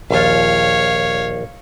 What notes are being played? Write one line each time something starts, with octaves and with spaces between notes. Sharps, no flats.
A#1 D#2 F4 C#5 F5